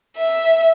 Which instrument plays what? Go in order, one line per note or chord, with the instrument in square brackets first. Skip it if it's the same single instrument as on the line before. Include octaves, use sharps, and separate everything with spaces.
[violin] E5